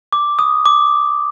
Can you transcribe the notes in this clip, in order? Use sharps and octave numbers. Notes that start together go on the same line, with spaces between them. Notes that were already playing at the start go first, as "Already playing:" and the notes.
D6
D#6
D6